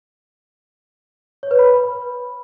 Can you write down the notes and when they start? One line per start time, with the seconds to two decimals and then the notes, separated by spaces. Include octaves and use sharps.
1.43 C#5
1.51 B4
1.59 B5